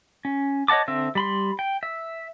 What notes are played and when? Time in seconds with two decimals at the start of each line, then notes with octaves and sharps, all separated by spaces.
0.25 C#4
0.68 C#5 D#5 F#5 A5 D6
0.88 D3 C4 E5
1.15 G3 B5 C6
1.59 G5
1.83 E5